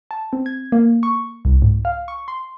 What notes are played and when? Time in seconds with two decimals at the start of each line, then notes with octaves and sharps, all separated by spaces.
0.11 A5
0.33 C4
0.46 G#6
0.72 A#3
1.03 C#6
1.45 C2
1.62 G#2
1.85 F5
2.08 C#6
2.28 C6